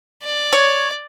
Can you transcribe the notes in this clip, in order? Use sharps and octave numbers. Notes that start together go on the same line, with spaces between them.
D5
C#5